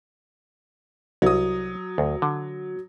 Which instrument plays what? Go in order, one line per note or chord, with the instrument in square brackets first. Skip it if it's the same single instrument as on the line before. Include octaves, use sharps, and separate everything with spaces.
[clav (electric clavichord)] C2 [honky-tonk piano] F#3 D#6
[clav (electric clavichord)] D2
D3